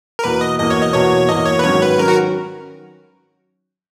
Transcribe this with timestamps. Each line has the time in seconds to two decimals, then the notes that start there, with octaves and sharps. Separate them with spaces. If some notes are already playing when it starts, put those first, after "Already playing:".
0.19 A#4
0.24 E2 B2 A#3 B4
0.41 D#5
0.59 E2 B2 A#3 D#5
0.70 C#5
0.82 D#5
0.93 E2 B2 A#3 C#5
1.28 E2 B2 A#3 D#5
1.46 C#5
1.59 B4
1.63 G#2 D#3 F#3 C#4 C#5
1.82 B4
1.98 D#3 F#3 C#4 A#4
2.08 F#4